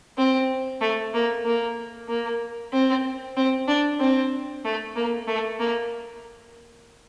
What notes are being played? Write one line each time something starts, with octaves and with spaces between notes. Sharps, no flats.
C4
A3
A#3
A#3
A#3
C4
C4
D4
C4
A3
A#3
A3
A#3